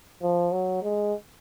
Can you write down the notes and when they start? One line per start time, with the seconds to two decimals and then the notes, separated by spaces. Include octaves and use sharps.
0.22 F3
0.52 F#3
0.82 G#3